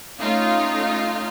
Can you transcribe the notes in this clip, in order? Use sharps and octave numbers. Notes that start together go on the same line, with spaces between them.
A3 C#4 D#4 F4 F5